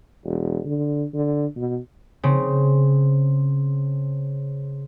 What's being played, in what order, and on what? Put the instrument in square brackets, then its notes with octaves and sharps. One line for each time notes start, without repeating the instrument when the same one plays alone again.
[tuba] E1
D3
D3
B2
[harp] C#3 C4